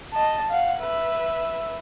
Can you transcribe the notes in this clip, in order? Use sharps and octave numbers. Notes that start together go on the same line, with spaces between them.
D#5 A5
F5 F#5
B4 E5